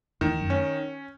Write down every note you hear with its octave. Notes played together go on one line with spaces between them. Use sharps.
E2 D#3
F#2
C#4